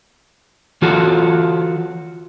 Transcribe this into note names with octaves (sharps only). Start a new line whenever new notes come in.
E3 F4 F#4 A4